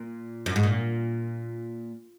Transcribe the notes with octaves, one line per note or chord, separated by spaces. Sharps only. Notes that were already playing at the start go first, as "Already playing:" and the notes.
Already playing: A#2
F#2
G#2
A#2